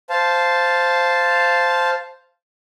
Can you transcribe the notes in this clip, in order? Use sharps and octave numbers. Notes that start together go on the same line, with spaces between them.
C5 F5 A5